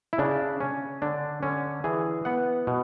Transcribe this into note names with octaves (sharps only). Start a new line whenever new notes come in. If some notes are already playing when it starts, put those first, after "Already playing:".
E4
C#3 D4
C#4
D3 D4
D3 C#4
E3 G#4
B3 F#5
B2